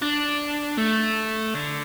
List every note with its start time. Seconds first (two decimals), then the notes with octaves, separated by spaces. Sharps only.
0.02 D4
0.78 A3
1.55 D3